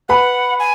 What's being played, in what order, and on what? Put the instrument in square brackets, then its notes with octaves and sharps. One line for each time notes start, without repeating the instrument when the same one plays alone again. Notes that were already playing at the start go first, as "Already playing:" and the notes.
[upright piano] B4 B5 [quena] F#5
[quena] G#5